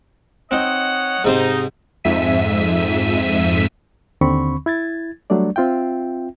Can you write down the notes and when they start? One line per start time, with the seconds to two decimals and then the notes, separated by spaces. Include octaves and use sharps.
0.51 C4 D#4 C#5 D#5 F#5
1.24 G#2 C3 D#4 C5
2.04 F2 G#2 E5 B6 D#7
4.21 D#2 D3 C4 B5 C#6
4.66 E4 G#6 A6
5.30 F#3 G3 A3 D4 D5
5.56 C4 F4 E5 G5